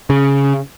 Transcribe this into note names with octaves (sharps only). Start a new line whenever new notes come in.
C#3